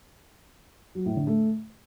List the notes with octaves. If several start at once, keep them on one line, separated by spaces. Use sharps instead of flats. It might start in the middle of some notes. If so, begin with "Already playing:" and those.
F#3
A2
D3
A3